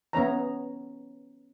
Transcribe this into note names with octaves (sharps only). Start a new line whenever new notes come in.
B3 C#4 C#5 A#5